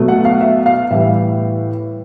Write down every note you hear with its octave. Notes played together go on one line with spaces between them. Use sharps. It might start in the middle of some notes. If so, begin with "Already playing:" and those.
Already playing: B2 F#3 A3
F#5
F5
E5
F5
A2 E3 G3 E5